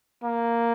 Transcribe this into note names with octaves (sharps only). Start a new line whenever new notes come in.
A#3